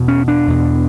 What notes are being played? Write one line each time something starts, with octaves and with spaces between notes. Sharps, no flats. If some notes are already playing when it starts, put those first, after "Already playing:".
Already playing: E2 B2
C#4
D4
E2 B2